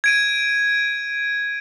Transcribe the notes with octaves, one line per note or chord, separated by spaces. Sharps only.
G#6 D7 D#7